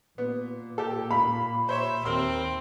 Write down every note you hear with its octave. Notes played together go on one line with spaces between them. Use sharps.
A#2 B3
G4 A4
F5 B5
C5 C#5 E5
D#2 C4 A#4 C6 E6